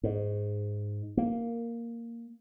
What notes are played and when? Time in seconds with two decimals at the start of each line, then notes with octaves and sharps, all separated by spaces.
0.03 G#2
1.17 A#3